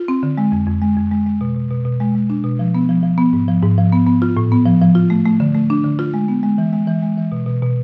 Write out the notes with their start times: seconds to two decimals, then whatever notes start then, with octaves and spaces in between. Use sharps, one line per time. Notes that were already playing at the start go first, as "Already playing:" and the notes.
Already playing: F4
0.08 C4
0.23 D3
0.38 G#3
0.52 F2
0.67 F2
0.82 G#3
0.96 F2
1.11 G#3
1.26 G#3
1.41 B2
1.56 B2
1.71 B2
1.85 B2
2.00 G#3
2.15 G#3
2.30 D4
2.44 B2
2.59 F3
2.75 B3
2.89 F3
3.03 F3
3.18 B3
3.33 G#2
3.48 F3
3.62 G#2
3.78 F3
3.92 B3
4.07 B3
4.22 F4
4.37 A2
4.52 B3
4.66 F3
4.82 F3
4.95 F4
5.10 A3
5.26 A3
5.40 D3
5.55 A3
5.70 D4
5.84 D3
5.99 F4
6.14 G#3
6.28 B3
6.43 G#3
6.58 E3
6.73 G#3
6.87 E3
7.03 G#3
7.18 E3
7.32 B2
7.46 B2
7.62 B2